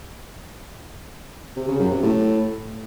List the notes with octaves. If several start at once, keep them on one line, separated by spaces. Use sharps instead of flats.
C3
C#3
F#2
C3
A2